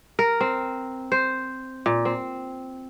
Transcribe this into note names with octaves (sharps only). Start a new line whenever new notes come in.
A#4
C4
C5
A#2
C4